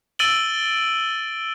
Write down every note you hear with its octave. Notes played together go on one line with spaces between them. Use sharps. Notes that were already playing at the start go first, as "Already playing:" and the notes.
E6 A6 D7 D#7 F#7 G7